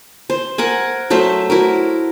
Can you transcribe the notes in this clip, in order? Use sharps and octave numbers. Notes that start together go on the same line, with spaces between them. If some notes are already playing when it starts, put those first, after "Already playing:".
C5
A#4 F#5 G#5
F#3 A3 C5 E5
E4 F#4 A#4